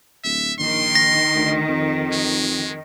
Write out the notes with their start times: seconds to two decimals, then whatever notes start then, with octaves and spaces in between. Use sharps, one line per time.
0.24 D1 E5
0.60 A#1 D#3 C6
0.95 A#6
1.35 D2
1.68 F2
2.12 G#3